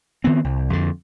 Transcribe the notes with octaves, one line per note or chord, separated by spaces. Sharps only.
D#3 B3 C4
C2
F2 D3